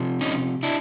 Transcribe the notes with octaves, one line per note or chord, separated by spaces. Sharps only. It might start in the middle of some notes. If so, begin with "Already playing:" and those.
Already playing: C3 F3
C#4 D#4
D4 E4